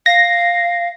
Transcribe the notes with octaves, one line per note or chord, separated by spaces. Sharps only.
F5 A#6